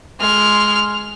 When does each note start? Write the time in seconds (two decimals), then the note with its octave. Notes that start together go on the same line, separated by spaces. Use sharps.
0.20 G#3 F6